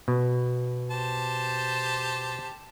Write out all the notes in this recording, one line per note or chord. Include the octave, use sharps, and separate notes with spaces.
B2
G4 C5 A5